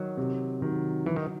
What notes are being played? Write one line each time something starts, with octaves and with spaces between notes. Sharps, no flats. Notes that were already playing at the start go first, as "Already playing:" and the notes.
Already playing: D#3 F#3
C3
D#3 F#3
E3 F#3
D#3